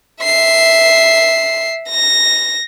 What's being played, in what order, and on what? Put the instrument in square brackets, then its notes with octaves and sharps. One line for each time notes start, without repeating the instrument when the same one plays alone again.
[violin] E5 C7
A#6